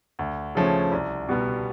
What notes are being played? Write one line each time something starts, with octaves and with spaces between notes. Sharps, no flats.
D2
C#3 F3 A3 C#4
C2
B2 G3 B3